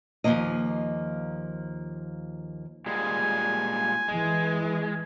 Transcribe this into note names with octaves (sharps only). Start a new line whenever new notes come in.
D#2 C3 F3 A#3 D#5
A#2 G3 G#3 G#5
E3 G#3